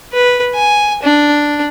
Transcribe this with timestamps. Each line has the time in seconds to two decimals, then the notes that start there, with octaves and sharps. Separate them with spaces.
0.13 B4
0.54 G#5
1.03 D4